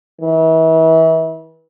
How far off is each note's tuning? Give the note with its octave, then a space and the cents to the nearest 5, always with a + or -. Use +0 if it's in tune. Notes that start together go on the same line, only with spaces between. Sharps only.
E3 -35